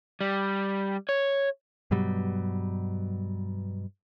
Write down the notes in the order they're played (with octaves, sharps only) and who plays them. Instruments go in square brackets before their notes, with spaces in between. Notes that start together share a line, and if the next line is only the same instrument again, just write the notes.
[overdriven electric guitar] G3
C#5
[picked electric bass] G2 B2 F#3 G3